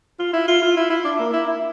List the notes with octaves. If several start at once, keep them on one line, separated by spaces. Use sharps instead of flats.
F4
E4
F4
F4
E4
E4
D4
A#3
E4
E4